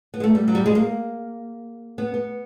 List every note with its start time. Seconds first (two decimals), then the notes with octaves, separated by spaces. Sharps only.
0.14 B3
0.20 G#3
0.24 A3
0.35 G3
0.48 F#3
0.55 G3
0.66 G#3
0.75 A#3
1.98 B3
2.14 B3